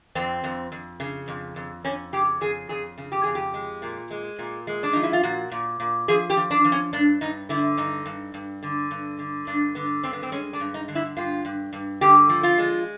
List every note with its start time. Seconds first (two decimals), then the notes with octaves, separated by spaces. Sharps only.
0.15 F2 C4
0.44 F2
0.72 F2
1.00 C#3
1.28 F2
1.56 F2
1.84 F2 C#4
2.13 C#3 G4
2.41 F2 G#4
2.69 F2 G#4
2.98 C#3
3.12 G4
3.23 F2 G#4
3.35 G4
3.54 G#3
3.82 A#2
4.11 G#3
4.39 A#2
4.67 G#3
4.83 D4
4.93 F3 D#4
5.03 E4
5.13 F4
5.23 A#2 F#4
5.52 A#2
5.80 A#2
6.08 F3 G#4
6.30 G4
6.37 F3
6.51 D4
6.64 F3
6.72 C#4
6.93 G2 D4
7.21 G2 D#4
7.49 D3 E4
7.77 G2 D#4
8.06 G2
8.34 G2
8.63 D3
8.91 G2
9.19 D3
9.47 G2 D4
9.75 D3 B3
10.03 G2 C4
10.13 B3
10.23 C4
10.32 G#3 C#4
10.53 D4
10.60 G2
10.74 D#4
10.88 D3
10.95 E4
11.17 G2 F4
11.45 G2
11.73 G2
12.01 D3 G4
12.29 F3
12.43 F4
12.58 G#3